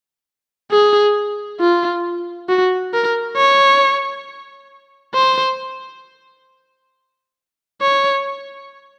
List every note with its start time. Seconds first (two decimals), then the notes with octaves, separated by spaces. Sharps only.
0.71 G#4
1.60 F4
2.49 F#4
2.94 A#4
3.37 C#5
5.15 C5
7.82 C#5